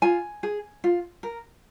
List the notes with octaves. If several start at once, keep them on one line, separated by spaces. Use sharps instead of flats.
F4 G#5
G#4
F4
A#4